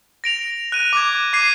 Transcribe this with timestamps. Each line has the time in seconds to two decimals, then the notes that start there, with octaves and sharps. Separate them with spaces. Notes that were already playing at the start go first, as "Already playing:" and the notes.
0.24 A#6 D7 F7
0.72 F#6 D#7
0.93 D6 G#6
1.33 D6 G#6 C7 D#7